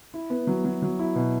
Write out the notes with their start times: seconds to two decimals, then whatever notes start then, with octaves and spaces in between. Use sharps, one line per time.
0.14 E4
0.30 B3
0.47 F#3
0.65 F#3
0.82 F#3
0.99 E4
1.15 B2